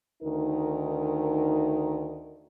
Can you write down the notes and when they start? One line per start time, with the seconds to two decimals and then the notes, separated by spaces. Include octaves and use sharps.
0.22 D2 D#3 D#4 A#4